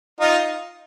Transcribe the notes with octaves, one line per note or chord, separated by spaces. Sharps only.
D#4 F4